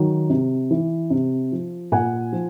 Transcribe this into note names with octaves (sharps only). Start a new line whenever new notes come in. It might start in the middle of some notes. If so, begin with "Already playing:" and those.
Already playing: D#3 F#3
C3
E3
C3
F3
A#2 F#5 G#5
F3